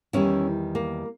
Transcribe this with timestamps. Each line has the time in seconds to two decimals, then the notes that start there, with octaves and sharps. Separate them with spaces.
0.13 E2 D#3 G3 C#4 E4
0.75 A#3